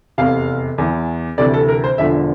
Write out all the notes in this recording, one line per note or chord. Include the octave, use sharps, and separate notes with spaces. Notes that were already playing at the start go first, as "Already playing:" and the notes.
F1 E2 C3 F5
E2 E3
D2 C3 E3 D5
A4
A#4
C5
E1 E2 D3 F3 E5